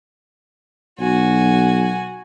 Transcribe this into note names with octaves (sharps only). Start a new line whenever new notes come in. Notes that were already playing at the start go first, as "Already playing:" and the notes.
B1 F#4 G#5